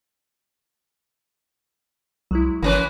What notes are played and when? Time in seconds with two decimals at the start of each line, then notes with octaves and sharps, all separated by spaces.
2.31 C2 F#3 G#3 E4
2.62 G1 E3 F3 A#3 C#4 B4